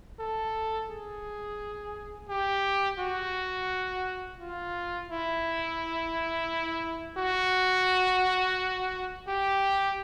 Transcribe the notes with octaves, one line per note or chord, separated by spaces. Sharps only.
A4
G#4
G4
F#4
F4
E4
F#4
G4